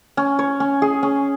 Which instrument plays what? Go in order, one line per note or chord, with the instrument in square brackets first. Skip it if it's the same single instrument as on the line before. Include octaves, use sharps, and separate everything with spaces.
[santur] C#4
C#5
C#4
G#4
C#4